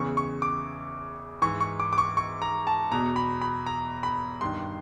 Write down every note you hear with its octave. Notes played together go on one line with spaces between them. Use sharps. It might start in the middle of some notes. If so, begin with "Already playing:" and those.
Already playing: E2 C#3 E3 C#6
C#6
D6
G#2 E3 C#6
C#6
D6
D6
C#6
C#6
A#5
A5
E2 B2 A#5
B5
B5
A#5
B5
G2 D#3 C6